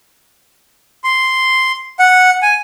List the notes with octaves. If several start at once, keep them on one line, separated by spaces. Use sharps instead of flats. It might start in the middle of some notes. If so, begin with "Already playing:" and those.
C6
F#5
G#5